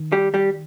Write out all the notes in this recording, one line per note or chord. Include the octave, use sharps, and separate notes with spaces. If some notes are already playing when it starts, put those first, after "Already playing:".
Already playing: D#3
G3 G4
G3 G4